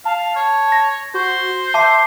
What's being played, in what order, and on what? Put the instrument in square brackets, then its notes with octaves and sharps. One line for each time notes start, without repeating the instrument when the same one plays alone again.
[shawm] F5 [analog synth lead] A5
[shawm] C#5
[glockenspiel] A#6
[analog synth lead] F#4 [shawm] C5
[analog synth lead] E5 [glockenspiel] A5 D6 C7